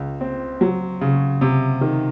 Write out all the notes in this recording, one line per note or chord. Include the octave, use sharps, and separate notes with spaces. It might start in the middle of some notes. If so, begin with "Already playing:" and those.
Already playing: C#2
C4
F#3
C#3
C3
D#3